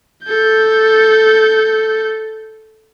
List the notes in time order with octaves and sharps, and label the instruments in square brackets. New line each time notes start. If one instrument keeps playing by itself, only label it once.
[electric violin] A4 G6